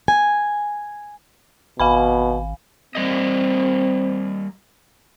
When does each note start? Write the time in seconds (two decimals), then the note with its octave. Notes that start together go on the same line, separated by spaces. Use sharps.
0.08 G#5
1.80 G#1 B2 F5 G#5 B5
2.95 G3 A#3 C4 D#5